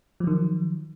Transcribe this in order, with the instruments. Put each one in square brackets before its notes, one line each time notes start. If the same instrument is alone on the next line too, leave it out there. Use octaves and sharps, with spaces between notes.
[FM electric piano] F3
F#3
D#3